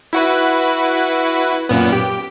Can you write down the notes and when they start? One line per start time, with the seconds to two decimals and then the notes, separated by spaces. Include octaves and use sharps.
0.13 E4 F#4 B4
1.69 F#2 A#2 B3
1.92 G4